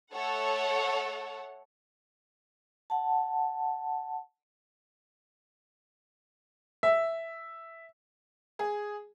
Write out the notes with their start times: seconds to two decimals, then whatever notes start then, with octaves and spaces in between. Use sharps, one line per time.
0.14 A3 A4 C#5 F#5
2.90 F#5 A5
6.83 E5
8.59 G#4